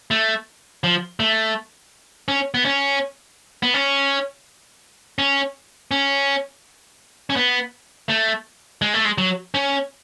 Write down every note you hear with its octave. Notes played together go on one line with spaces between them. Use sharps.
A3
F3
A3
C#4
B3
C#4
B3
C#4
C#4
C#4
C#4
B3
A3
G#3
A3
G#3
F#3
C#4